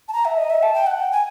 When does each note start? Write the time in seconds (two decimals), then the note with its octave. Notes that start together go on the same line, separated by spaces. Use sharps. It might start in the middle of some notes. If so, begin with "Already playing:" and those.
0.08 A5
0.13 A#5
0.25 E5
0.37 D#5
0.50 E5
0.63 A5
0.74 G5
0.87 F#5
1.00 G5
1.12 G#5